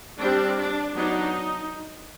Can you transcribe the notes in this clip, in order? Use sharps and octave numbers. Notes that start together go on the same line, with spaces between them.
G3 C4 D4
D4
F#3 B3 D4 D#4